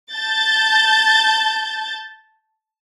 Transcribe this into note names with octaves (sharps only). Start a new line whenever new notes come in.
A5 G6 A6